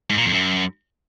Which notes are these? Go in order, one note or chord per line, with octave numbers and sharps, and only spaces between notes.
G#2
A#2
F2
F#2